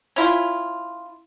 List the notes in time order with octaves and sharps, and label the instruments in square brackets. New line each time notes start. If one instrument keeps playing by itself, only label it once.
[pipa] C#4 E4 F4